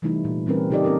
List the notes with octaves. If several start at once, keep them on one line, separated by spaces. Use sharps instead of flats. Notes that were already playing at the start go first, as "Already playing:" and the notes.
C3 E3 G3 A3 D#4 E4
A#2
E3 G3 C4 C#4 A#4 B4
C#3 D#4 G4 A4 D5 D#5
A#3 C4 C#4 A4 A#4